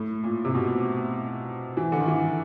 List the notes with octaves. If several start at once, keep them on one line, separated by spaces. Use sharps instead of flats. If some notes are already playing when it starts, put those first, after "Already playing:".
Already playing: A2
A#2
C3
B2
E3
D3
D#3
E3